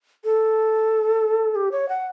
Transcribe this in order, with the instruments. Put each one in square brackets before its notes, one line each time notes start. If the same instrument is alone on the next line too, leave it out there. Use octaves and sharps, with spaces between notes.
[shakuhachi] A4
G4
C#5
F#5